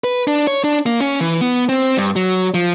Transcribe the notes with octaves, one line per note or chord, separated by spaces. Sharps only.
B4
D4
C#5
D4
A#3
C#4
E3
B3
C4
G2
F#3
F3